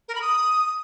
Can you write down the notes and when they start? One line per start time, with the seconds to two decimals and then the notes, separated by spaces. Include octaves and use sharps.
0.08 A#4
0.15 B5
0.21 D#6